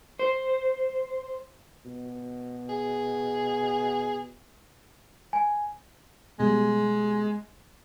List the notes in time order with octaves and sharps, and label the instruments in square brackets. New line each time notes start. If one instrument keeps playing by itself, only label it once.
[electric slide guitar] C5
[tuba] B2
[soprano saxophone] G#4
[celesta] G#5
[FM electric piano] B2 G3 [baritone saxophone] G#3